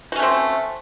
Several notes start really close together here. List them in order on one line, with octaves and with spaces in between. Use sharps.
F#4 C#4 A3 C4